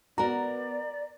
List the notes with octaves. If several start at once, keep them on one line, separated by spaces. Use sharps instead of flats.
B3 F#4 A#4 D5 A#5